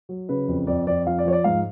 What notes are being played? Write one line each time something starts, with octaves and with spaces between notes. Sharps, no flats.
F#3
C#3 B4
F2
F2 D5
F2 D5
F3 F5
D5
F3 C#5
D5
G#2 F5